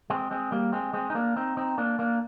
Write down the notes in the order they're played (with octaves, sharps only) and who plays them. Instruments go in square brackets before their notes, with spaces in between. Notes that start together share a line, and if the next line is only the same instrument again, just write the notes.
[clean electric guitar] G#3 C4
G#3 C4
G3 A#3
G#3 C4
G#3 C4
D#4
A#3 D4
C4 D#4
C4 D#4
A#3 D4
A#3 D4